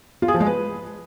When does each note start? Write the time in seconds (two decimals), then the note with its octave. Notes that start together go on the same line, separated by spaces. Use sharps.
0.22 F4
0.28 G#4
0.34 F3
0.40 G#3
0.46 B4